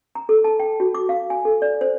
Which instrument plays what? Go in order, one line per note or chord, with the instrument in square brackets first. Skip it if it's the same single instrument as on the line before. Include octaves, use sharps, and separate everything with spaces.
[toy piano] A#5
A4
A5
G5
F#4
D6
F5
G#5
A4
D5
C5